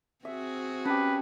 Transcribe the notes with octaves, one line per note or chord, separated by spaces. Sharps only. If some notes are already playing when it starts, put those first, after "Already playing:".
C4 F#4 G#4 E5
C#4 G4 B4 A5